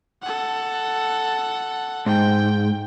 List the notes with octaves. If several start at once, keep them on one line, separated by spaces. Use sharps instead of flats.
A4 F#5
G#2 G5